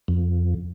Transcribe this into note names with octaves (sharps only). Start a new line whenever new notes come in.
F2